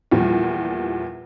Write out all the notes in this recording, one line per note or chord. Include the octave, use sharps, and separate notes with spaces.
E2 A#2 F3 G3